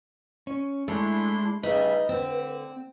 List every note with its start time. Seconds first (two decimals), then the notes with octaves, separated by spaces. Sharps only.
0.47 C#4
0.88 G#3 A3 D4 E4 C6
1.63 C#3 G3 D#4 B4 E5
2.09 D3 C4